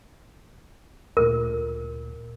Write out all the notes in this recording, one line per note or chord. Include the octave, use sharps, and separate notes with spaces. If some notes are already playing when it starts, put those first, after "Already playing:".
D2 A#2 A#4